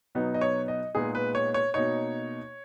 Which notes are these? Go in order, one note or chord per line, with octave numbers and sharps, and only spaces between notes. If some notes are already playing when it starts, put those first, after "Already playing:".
B2 F#3 B3 D#4
D#5
C#5
D#5
A#2 G#3 B3 D#4 G#4
B4
C#5
C#5
B2 A#3 D#4 C#5